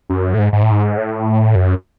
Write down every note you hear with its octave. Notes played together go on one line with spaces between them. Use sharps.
F#2
A2
G#2
G#2
A2
G#2
A2
F#2